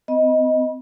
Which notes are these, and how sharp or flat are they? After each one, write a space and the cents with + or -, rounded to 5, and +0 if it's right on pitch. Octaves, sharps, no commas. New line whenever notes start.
C4 -45 D#5 +10 B5 -30